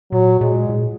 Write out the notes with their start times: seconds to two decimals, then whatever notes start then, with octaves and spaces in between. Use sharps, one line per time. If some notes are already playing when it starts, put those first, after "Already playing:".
0.12 A#2 F#3
0.40 A#2 G#3
0.69 A#2